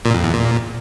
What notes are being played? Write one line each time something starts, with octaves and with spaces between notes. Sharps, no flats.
A#2
F2
E2
A#2